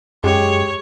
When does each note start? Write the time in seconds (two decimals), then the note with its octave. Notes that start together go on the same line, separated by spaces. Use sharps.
0.24 F#2 G#3 G4 C#5